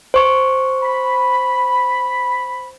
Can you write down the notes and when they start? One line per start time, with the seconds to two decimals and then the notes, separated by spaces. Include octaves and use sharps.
0.14 C5 C#6
0.82 B5